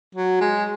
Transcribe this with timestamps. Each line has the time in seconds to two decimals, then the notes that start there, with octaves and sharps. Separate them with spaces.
0.15 F#3
0.41 G#3